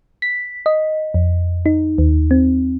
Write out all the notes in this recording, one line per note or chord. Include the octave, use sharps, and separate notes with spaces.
B6
D#5
F2
D#4
D#2
C4